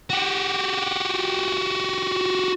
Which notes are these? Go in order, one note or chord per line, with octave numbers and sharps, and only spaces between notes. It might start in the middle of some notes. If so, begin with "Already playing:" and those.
F#4 G4